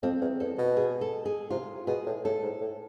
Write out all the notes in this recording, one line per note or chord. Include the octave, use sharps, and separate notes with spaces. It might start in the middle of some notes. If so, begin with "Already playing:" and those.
F2 C4
E2
E2 A4
B2
G#4
A4
G#4
C3 F4
B2 G#4
A2
A2 A4
G#2
A2